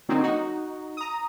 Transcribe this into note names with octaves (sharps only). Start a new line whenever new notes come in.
D3 F#3 A#3 C4 D#4
D#4 F#4
A#5 D#6